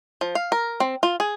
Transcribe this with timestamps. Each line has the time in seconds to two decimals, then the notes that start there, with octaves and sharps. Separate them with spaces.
0.21 F3
0.35 F5
0.52 A#4
0.80 C4
1.03 F4
1.20 G#4